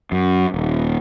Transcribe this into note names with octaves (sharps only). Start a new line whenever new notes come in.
F#2
D#1